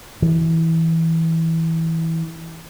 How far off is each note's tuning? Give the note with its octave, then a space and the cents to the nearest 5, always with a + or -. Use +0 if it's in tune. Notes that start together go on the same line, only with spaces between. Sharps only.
E3 -15